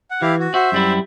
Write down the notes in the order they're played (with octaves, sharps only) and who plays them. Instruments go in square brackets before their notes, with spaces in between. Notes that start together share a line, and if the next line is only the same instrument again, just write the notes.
[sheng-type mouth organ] F#5
[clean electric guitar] E3 [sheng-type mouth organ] E4 G4 F5
[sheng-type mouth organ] F#4
[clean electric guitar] F#4 [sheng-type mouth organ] C5 E5
[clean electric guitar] F#2 G3 E4